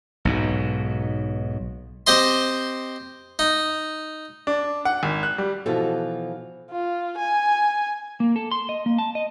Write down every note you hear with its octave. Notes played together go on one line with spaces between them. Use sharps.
B1 G#2 B2
C4 G4 C5 D#5 C6
D#4
D4
F#5
G#1
F#6
G3
B2 E3 F3 E4 F#4 A4
F4
G#5
A#3
A4
C6
D#5
A#3
A5
D#5